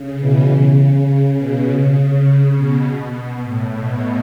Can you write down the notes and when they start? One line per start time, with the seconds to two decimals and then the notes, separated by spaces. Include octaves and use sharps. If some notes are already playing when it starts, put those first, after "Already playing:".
Already playing: C#3
0.20 B2 E3
0.49 C#3
1.08 C#3
1.37 B2
1.67 C#3
2.26 C#3
2.56 B2
3.15 B2
3.44 A2
3.74 B2